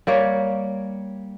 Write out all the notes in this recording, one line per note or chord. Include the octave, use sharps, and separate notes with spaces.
G3 A#3 C#5